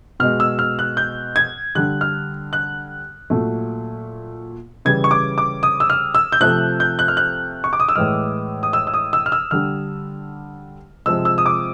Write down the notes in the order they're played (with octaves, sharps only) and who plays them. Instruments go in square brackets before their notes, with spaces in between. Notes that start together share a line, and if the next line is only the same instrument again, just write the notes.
[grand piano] B2 G#3 F6
E6
F6
F#6
G6
G#6
D3 G3 F#6
F6
F#6
A#2 F#3 A3
C#3 E3 G3 G#6
C#6
D6
D6
D#6
E6
F6
E6
G6
C3 F3 A3 F#6
G6
F#6
F6
F#6
C#6
D6
D#6
E6
A2 E3 G#3 F6
D#6
E6
E6
D#6
E6
F6
E6
D3 G3 F6
C3 F3 G#3 E6
E6
D#6
D6